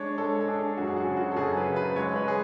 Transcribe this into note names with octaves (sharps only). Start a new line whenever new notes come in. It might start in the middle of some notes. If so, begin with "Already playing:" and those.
Already playing: G#3 D4 C#5
G#3 A4
A4
D4 G#4
F#2 F#4
G#4
F#4
C#3
F#4
A4
F#2 G#4
B4
C#3
B4
G#3 C#5
B4
G#3 G#4